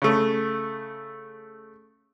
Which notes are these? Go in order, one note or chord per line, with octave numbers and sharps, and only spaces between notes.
C#3 A3